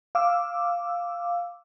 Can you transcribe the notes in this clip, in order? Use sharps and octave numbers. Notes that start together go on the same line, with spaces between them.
F5 D6 E6